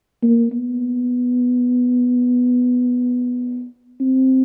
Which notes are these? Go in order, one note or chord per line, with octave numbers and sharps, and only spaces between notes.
A#3
B3
C4